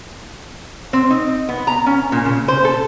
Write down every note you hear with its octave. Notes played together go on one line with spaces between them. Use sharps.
C4
D#4
B3
A#5
C#4
A#2
C#3
C5
A4